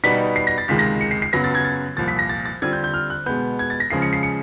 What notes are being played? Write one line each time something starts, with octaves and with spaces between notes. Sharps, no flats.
B2 G3 B3 D#4 B6
C7
A#6
A6
C#2 C3 D#3 G#3 B6
A#6
C#7
C7
C7
F#2 C#3 F#3 B3 A#6
A6
G#6
A6
C2 A#2 F3 A6
B6
A#6
A6
A6
D3 G3 C4 F4 G#6
G6
G6
F6
F#6
B2 G#3 B3 G6
G#6
A6
A#6
C#3 F3 G#3 C#4 C7
C#7
C7
C#7